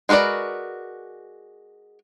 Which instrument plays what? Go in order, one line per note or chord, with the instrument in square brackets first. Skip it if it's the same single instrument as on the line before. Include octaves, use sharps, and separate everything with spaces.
[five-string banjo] G#3 F#4 A#4 B4 D5